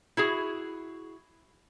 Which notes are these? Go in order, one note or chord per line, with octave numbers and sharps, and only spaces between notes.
E4 F#4 G#4